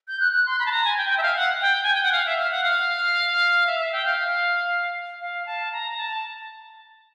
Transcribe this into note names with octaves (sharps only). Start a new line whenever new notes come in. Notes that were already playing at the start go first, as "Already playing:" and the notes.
G6
F#6
F#6
C6
B5
A5
A#5
G#5
G5
G5
E5
F5
F#5
G5
G#5
G5
F#5
F5
E5
F5
F#5
F5
E5
E5
G5
F5
F5
A5
A#5
A5